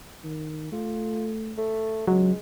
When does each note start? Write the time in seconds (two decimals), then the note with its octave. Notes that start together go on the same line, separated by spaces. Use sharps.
0.24 D#3
0.72 A3 F4
1.58 A3
2.08 C#2 F#3 G#3